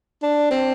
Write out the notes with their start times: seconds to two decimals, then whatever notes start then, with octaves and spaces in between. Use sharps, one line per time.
0.23 D4
0.51 C4